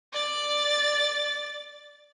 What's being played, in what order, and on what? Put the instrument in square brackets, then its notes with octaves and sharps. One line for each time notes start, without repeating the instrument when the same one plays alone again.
[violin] D5 A6